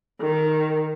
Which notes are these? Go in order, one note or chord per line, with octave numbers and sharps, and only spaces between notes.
D#3